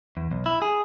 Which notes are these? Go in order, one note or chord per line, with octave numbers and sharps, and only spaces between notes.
E2
B1
E4
G#4